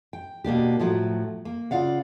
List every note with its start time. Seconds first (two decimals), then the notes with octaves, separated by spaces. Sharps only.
0.13 G5
0.44 B2 A#3 D4 G4
0.79 A2 F3 F#3 A3
1.45 A#3
1.71 C#3 F4 D5 F5 F#5